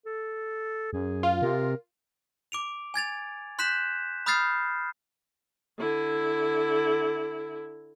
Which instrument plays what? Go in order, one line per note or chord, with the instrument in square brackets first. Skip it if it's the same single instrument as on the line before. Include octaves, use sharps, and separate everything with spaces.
[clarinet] A4
[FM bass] F#2 [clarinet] G#4
[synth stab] F4
[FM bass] C3 [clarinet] A#4
[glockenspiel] D6 D7 F7
G#5 G#6 A6 F7
C6 F#6 G6 B6 E7
B5 D#6 F6 G6 A6 C7
[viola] D3 E4